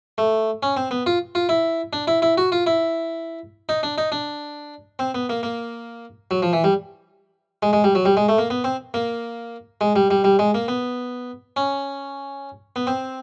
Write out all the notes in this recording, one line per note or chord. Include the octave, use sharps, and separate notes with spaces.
A3
C#4
C4
B3
F4
F4
E4
D4
E4
E4
F#4
F4
E4
D#4
D4
D#4
D4
C4
B3
A#3
A#3
F#3
F3
E3
G3
G#3
G#3
G3
F#3
G3
G#3
A3
A#3
B3
C4
A#3
G#3
G3
G3
G3
G#3
A#3
B3
C#4
B3
C4